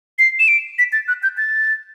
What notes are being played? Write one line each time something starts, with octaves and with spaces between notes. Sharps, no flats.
C7
E7
D7
B6
A6
F#6
G6
A6